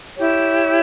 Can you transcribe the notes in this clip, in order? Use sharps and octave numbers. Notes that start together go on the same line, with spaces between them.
E4 G4 C#5